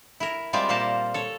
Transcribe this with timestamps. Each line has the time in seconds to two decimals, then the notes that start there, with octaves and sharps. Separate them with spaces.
0.20 E4 A#4
0.53 G3 G#3 C4 F4 D5 E5
0.69 A#2 A#3 A#4 C5 A5
1.14 A4 C#5